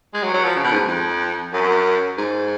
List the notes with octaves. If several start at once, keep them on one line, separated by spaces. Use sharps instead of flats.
G#3
F#3
F#3
F3
C#3
B2
G#2
F2
F#2
G#2